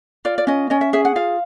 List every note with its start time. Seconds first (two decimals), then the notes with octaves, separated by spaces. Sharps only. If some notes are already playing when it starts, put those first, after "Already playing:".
0.25 F4 D5
0.38 D5
0.47 C#4 D#5
0.70 C#4 D#5
0.81 E5
0.93 G#4 E5
1.05 F#5
1.16 F4 F5